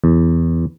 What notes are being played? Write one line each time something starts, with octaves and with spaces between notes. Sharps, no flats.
E2